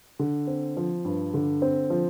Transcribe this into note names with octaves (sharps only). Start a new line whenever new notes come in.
D3
C4
F3
G2
D3
C4
F3